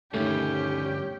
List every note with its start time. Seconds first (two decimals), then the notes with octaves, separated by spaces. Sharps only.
0.14 D2 G2 D#3 A3 C#4 G4